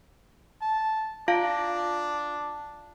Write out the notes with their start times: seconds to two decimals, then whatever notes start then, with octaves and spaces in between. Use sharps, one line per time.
0.62 A5
1.28 D4 F4 F5 A5